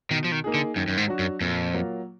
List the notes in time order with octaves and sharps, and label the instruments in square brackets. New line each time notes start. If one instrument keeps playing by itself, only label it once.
[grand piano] B2 [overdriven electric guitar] D#3
[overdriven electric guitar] F3
D#3
[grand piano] A#3 D#4 G#4
[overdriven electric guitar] D3
[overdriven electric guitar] F#2 [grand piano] D#3
[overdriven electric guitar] F#2
G#2
[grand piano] F#3 D4 F#4
[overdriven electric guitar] F#2
[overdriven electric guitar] F2 [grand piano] A#2
[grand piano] F#3 A#3 F4